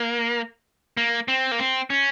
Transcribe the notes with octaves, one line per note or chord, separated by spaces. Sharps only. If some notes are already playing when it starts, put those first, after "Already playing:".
Already playing: A#3
A#3
C4
A#3
C4
C#4